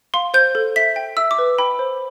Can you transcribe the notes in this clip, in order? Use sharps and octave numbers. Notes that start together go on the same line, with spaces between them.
F5 C6
C5 G6
A4
E5 B6
G5
E5 E6
D6
B4
G5 B5
C5